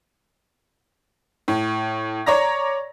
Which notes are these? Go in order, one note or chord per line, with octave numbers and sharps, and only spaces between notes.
A2
C#5 D5 A#5 A#6